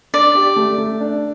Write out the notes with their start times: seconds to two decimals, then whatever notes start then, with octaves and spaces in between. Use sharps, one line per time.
0.14 D4 D5
0.35 G4
0.56 A3
0.78 A3
1.01 D4